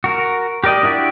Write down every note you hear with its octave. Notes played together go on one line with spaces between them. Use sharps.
F#4 A#4
G4 A#4 D5 D#5
D4 E4 F#4 G4 D5